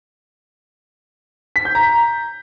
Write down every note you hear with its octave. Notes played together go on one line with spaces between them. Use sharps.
B6
G6
A#5